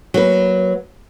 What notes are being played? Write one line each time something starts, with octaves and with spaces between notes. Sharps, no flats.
F#3 A#3 B4